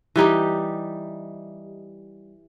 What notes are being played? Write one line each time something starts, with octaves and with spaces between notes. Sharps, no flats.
E3 G3 D#4 G4